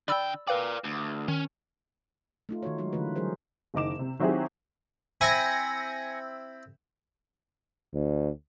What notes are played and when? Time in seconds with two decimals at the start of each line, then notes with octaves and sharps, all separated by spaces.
0.08 D3 D5 G5 B5 E6
0.47 A#4 B4 D5 F5 G5
0.84 D2
1.28 D#3 C#4
2.49 A3 D#4 F4
2.63 D#3 D#4 F#4 C#5
2.78 F#3 G#3 D#4 F#4
2.93 D3 E3 A3 F4 B4
3.16 F#3 G3 G#4 A#4 C5
3.74 F#1 D#3 D#5 D6 E7
3.99 C3
4.20 D#3 F#3 C4 E4 G4 G#4
5.21 C4 E4 G#5 B5 A#6 C#7
7.93 D2